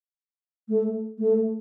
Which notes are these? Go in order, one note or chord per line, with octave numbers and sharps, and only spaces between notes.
A3
A3